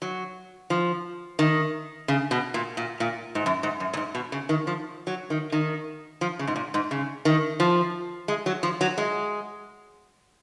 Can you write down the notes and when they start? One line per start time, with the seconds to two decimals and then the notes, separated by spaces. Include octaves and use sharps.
0.02 F#3
0.70 F3
1.39 D#3
2.08 C#3
2.31 B2
2.54 A#2
2.77 A#2
3.00 A#2
3.35 G#2
3.46 F#2
3.63 G#2
3.80 F#2
3.93 A#2
3.97 G#2
4.15 B2
4.32 C#3
4.49 D#3
4.67 F3
5.07 F#3
5.30 D#3
5.52 D#3
6.21 F3
6.39 C#3
6.47 G#2
6.56 A#2
6.74 G#2
6.91 C#3
7.25 D#3
7.60 F3
8.28 G#3
8.46 F#3
8.63 F3
8.81 F#3
8.98 G#3